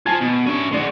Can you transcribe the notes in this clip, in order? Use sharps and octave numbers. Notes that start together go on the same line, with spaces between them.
F3 F4 G#5 A5 G#6
B2
C#4 D4 E5
G#3 F#4 G#4 D5